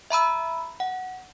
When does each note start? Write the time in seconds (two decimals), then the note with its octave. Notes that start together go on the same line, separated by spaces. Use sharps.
0.10 E5 A#5 B5 E6
0.80 F#5